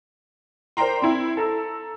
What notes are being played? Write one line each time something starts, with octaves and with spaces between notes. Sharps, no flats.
A#4 C5 D5 G5 A#5 C6
C4 E4
A4 A#5 E6